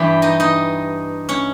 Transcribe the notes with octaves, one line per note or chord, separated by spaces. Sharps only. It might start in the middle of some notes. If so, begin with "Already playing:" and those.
Already playing: G2 E3 G3 G4 G5
D#4 D#5
D#4 D#5
C#4 C#5